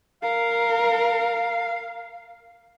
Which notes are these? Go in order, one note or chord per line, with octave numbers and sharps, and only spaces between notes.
A#4 F5